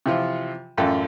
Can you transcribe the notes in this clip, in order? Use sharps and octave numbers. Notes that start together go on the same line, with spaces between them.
C3 E3 F3 F4
A1 F#2 F4 A4 G5